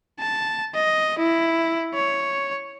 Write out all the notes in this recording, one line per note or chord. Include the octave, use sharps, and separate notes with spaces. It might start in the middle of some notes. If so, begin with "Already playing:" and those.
A5
D#5
E4
C#5